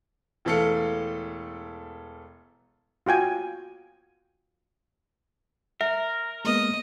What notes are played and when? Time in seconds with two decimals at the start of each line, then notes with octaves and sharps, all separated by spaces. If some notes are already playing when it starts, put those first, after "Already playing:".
0.45 E1 E3 A3 A4 F5 C#7
3.06 F4 F#4 G5 G#5
5.81 A#4 E5
6.45 G#3 A#3 B3 D#5